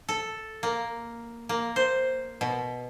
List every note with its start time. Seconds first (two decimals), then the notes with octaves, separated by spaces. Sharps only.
0.09 A4
0.63 A#3
1.49 A#3
1.76 C5
2.41 B2